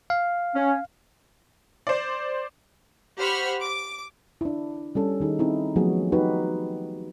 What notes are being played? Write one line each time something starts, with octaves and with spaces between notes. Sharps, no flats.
F5
C#4
C5 D5
G4 C5 F#5 B5 C#6 F6
D6
D4 E4
G3 C#4 A4
D#3 D#4 G#4
C4 D#4 E4
F3 F#3 A3 B3 F#4 G#4
D#4 F#4 G4 B4